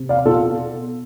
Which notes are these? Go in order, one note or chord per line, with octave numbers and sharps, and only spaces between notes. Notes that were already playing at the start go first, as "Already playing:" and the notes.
Already playing: C3
D5 F5
B2 F4 A4